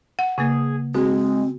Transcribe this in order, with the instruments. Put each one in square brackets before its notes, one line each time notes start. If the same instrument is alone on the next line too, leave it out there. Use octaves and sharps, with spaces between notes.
[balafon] F#5
[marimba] C#3 A#3 [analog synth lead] G#4
[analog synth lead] G#3 [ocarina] C4 [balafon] F#4